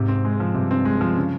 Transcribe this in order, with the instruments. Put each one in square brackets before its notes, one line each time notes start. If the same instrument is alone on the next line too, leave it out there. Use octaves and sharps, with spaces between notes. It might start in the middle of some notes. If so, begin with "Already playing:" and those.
Already playing: [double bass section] G#2 [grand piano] C3
[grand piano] C4
G#3
F3
[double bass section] G2 [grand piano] C3
[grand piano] C4
G#3
F3
C#3